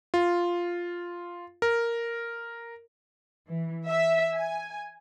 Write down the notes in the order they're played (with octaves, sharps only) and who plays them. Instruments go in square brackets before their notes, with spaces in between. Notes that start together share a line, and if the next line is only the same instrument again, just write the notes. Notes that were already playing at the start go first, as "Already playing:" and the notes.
[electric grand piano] F4
A#4
[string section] E3
E5
G#5